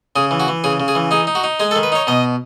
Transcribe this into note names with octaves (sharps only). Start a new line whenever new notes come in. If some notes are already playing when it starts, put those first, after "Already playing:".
C#3 G#4
E3
F#4
E3
C#3 G#4
C#3
G#4
E3
D#4 G#4
D#4
F#4
D#4
G#3 G#4
A4
D#3
B4
D#4 C#5
B2 D#5